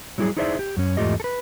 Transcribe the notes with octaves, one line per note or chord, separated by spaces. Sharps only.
F#3 G3 E4 G4 G#4
D#4 E4 G#4 C5 D5 E5
G4
F#2 C#4
E2 G#2 A3 F4 G4 D#5
A4 B4